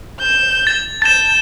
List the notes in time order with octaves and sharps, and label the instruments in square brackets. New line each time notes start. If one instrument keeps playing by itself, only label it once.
[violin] G6 E7
[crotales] A6
[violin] A5 G6 [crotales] A6 E7